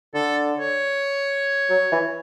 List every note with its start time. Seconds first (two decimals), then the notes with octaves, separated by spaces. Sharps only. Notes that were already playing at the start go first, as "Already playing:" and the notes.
0.14 D3 A4
0.59 C#5
1.70 F#3
1.92 E3